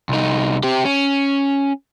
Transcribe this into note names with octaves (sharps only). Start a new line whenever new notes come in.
C2 D#4
C4 G4
C#4